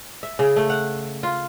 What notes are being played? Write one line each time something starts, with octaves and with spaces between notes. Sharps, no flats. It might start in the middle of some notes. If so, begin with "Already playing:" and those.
E5
C#3
A3
F#5
F4